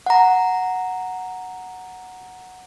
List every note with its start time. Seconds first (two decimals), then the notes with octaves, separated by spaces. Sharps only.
0.06 F#5 A#5